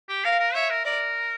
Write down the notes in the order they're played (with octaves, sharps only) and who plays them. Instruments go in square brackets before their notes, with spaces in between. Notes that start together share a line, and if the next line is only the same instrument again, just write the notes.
[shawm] G4
[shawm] A#4 [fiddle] F5
[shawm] A#4
[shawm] C#5 [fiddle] E5
[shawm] A#4
[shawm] A#4 [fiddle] D5